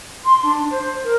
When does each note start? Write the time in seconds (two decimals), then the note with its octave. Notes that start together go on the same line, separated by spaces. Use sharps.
0.23 C6
0.43 D4
0.70 C5
1.04 A#4